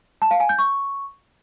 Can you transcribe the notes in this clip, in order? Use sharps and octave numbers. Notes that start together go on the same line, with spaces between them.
A5
F5
G#5
G6
C#6